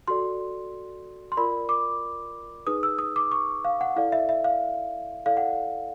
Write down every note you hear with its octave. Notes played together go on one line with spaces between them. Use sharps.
F#4 A4 D5 C6
C6
F4 A#4 D5 B5
D6
D#4 G#4 B4 D#6
E6
D#6
D6
C#6
F5
F#5
E4 A4 D5 F5
E5
E5
F5
E4 A4 D5 F5
F#5